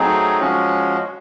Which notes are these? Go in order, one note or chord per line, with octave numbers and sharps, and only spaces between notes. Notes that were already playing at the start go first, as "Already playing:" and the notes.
Already playing: F#3 A3 C4 D#4 G#4
F3 G#3 C#4 F#4